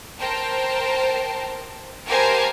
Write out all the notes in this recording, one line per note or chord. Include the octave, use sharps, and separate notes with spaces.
A#4 C5 G5 A5
G4 A#4 C5 F5 G#5 A5